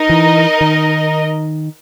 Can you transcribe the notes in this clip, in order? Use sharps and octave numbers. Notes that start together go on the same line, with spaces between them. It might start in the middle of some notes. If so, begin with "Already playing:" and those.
Already playing: D#4 A#4 D#5
E3
D#3